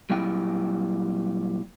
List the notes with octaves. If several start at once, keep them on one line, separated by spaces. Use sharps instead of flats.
A#2 F#3 G3 E4 G5